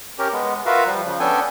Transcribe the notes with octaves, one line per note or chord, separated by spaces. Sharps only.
C#4 G4 A#4
G#3 B3
F4 F#4 A#4 B4 E5 F5
F3 G3
C#3 F3
B3 C#4 D4 A4 G5 G#5